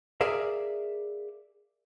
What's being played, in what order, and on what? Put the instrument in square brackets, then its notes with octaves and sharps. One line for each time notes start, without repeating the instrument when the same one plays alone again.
[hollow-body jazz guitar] G#4 A#4 D5 E5 F5